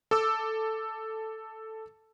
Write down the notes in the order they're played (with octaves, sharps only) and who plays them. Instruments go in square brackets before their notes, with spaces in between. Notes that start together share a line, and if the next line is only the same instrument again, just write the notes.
[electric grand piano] A4 D6 E6